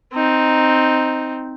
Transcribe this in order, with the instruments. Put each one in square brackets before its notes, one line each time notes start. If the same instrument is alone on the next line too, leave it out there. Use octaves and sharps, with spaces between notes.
[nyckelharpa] C4 D#4